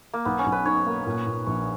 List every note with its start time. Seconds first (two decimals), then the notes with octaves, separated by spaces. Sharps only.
0.14 A#3
0.25 B1 B3
0.39 C#4
0.46 B1
0.52 B4
0.65 D#4 C#5
0.86 A#3
1.07 A#2
1.27 A#2
1.46 A#1 C#5